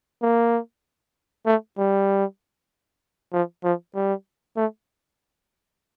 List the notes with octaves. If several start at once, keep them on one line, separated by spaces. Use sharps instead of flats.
A#3
A3
G3
F3
F3
G3
A3